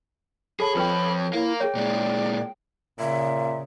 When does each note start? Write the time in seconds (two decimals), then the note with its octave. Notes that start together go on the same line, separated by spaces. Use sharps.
0.60 G#4 A4 C#5 A5 B5
0.75 F2 F3 F4 B4 G5
1.33 E4 A#4 F5
1.60 G#4 C#5 G5
1.75 A#2 G#3 D5
3.00 A#2 C#3 E5